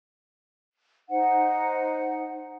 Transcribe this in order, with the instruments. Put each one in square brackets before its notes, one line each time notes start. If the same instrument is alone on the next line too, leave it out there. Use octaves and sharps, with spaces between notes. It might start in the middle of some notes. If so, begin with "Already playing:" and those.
[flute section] D#4 C5 F#5